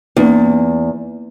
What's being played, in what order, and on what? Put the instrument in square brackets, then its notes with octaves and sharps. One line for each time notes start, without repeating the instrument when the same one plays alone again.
[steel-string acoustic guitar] E2 [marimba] A#3 C#4 D#4